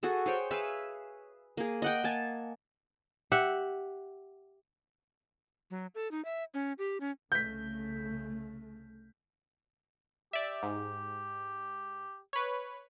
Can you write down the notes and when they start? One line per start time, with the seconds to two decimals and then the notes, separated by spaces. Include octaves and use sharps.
0.03 F#4 G#4 A4
0.26 G#4 C5 C#5 G5
0.51 G#4 B4 E5 F5
1.57 A#3 G#4
1.82 D#5 F#5 G5
2.04 A#3 G#5 A5
3.31 G4 E5 F#5
5.71 F#3
5.95 A4
6.11 D#4
6.25 E5
6.54 C#4
6.78 G4
7.00 C#4
7.32 C2 C#3 A3 G6 B6
10.33 G4 D5 E5
10.63 G#2
12.33 B4 C#5